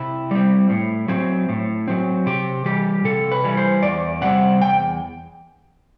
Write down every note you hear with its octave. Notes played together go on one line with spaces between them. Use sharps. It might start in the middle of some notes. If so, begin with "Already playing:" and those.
Already playing: C3 E4
G3 C4
A2
F#3 C4
A2
F#3 C4
C3 G4
E3 G3 G4
C3 A4
B4
E3 G3
C5
E2 D5
C3 G3 C4 F#5
E2 G5